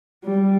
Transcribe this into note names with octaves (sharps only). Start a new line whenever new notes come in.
G3